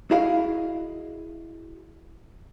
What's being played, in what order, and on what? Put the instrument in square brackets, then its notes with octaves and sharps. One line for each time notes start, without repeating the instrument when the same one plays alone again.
[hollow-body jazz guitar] E4 F#4 G#4 D#5 F5